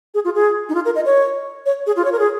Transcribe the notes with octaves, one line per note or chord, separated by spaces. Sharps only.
G#4
F4
G#4
D#4
F4
A#4
D#5
C#5
C#5
G#4
F4
C#5
A#4
G#4